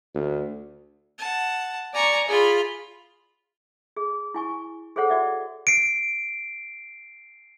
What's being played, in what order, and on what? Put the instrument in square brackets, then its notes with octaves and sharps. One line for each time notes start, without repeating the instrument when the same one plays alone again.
[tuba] D2
[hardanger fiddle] F#5 A5
[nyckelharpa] D5 C#6 [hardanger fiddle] G#5 A#5
[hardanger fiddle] F4 B5 [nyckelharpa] G#4
[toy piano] G#4
E4 G#5 C#6
G#4 A4 C5 C#5 F#5
F#4 D5 E5
[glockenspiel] C7 D7